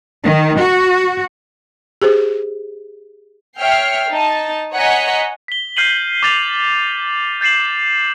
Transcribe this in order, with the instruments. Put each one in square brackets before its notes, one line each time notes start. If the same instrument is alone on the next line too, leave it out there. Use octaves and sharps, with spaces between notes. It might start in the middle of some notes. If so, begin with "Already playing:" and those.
[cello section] D#3
F#4
[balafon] G4 G#4 C5
[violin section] C#5 E5 G5 F6 C7
D#4 A5
C#5 D#5 F#5 G#5 A#5 B6
[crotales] B6 G7
F6 G6 C7 D#7 F#7
D6 G6 A6 F7
G6 A6 C7 E7 F#7